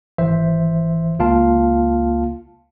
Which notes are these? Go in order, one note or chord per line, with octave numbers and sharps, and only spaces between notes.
G#1 E3 C5 E5
C#2 A#3 F4 F5 A5